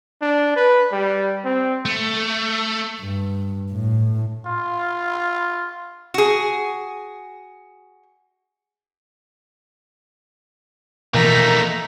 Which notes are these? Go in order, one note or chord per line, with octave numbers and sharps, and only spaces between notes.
D4
B4
G3
C4
A3
G2
A2
F4
F#4 G#4
B2 E3 F3 A3 A#3 D#4 A#5 B6